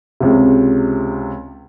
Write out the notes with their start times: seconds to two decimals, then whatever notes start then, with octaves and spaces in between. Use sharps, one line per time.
0.20 C#2 C3